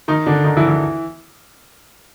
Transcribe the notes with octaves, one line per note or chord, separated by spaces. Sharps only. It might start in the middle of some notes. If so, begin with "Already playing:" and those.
D#3 D#4
D3 D4
D#3 D#4
E3 E4
E3 E4